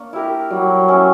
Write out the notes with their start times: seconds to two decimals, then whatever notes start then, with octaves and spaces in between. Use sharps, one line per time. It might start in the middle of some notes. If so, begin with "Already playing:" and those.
Already playing: A#3 D4 C#5
0.13 E4 G4 A#4
0.51 F#3 G3
0.88 C#4 E4